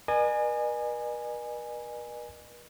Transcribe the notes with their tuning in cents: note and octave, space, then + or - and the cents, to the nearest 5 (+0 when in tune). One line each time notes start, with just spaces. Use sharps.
B4 -45 D#5 -45 G#5 +0